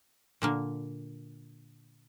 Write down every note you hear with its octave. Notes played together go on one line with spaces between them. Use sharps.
A#2 D3 A#3